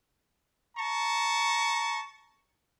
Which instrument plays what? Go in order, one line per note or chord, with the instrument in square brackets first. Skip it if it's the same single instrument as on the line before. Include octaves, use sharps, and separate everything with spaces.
[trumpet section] A5 A#5 C#6